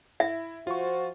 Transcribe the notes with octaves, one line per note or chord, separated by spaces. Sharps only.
E4 E5
F3 F4 F#4 C5 C#6